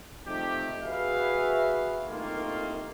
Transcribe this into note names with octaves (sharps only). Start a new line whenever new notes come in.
C3 F3 A3 D#4 G4
F#4 G#4 B4 E5 F5
C2 G2 D#3 A3 A#3 F4